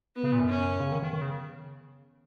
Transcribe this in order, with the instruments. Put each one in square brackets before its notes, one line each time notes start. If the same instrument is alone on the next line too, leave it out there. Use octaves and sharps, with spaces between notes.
[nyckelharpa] B3
[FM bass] C#3
A#2
F#2
[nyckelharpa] C#4
[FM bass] C#3
D#3
D#3
D#3
C#3